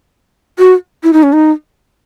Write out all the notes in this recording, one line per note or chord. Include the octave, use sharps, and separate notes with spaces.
F#4
E4
D#4
C#4
D#4